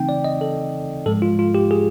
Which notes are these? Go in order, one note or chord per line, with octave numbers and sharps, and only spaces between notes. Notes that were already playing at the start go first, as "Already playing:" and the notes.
Already playing: C#3 E3 A3 C4 D#4 G5
D5
D#5
A4
G#2 F3 G#3 A4
F4
F4
G4
G#4